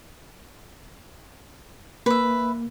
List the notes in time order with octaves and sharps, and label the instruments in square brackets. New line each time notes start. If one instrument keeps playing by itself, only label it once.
[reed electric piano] A#3 [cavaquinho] B4 E5